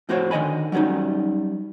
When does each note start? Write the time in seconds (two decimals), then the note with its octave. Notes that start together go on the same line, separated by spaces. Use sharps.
0.09 F2 A2 F#4 C5 C#5
0.31 D3 D#3 D#5 G#5 B5
0.72 F#3 G3 A3 C#4 D#4